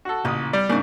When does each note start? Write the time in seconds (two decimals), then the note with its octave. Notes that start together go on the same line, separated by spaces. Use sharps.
0.05 F#4 A4
0.25 A1 A#2 C#3 D#6
0.53 G3 D5
0.69 G#2 C#3 A#3 D4 D#4